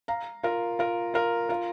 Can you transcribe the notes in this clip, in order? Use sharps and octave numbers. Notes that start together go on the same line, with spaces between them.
F5 A#5
F4 A#4
F4 A#4
F4 A#4
F4 A#4